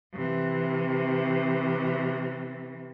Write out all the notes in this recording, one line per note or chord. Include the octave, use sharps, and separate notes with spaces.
C3 E3